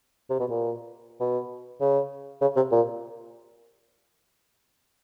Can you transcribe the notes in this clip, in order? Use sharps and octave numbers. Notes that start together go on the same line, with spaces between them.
C3
B2
A#2
B2
C#3
C#3
C3
A#2